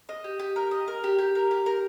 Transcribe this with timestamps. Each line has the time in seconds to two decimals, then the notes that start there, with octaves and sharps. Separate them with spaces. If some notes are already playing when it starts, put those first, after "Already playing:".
0.09 D#5
0.24 G4
0.40 G4
0.56 A#4
0.71 D#5
0.88 A#4
1.04 G4
1.19 G4
1.35 A#4
1.51 G4
1.66 A#4